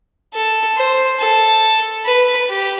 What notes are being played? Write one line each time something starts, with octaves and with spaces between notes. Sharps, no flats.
A4
C5
A4
B4
G4